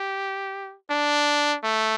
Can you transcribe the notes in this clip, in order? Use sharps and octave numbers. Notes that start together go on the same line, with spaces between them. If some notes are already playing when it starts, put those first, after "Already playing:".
Already playing: G4
D4
A3